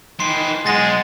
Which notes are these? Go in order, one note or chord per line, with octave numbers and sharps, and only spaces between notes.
D#3 E3 C6 C7
B1 G#3 F#5 A6 A#6